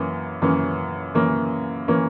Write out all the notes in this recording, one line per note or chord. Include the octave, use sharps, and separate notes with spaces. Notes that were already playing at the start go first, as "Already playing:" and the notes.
Already playing: F#2 E3 A#3 C#4
F#2 E3 A#3 C#4
F#2 E3 A#3 C#4
E3 A#3 C#4